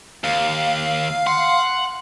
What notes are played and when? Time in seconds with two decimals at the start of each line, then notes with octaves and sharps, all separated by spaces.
0.24 D#2 F5
1.27 F#5 C6